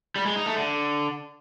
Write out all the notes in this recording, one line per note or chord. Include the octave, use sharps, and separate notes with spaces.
G3
G#3
D#4
A3
D3